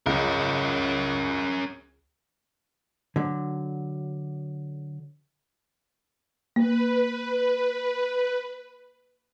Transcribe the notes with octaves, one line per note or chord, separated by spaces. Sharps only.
C#2 C#4 A#4
D3 F#3
A#3 B4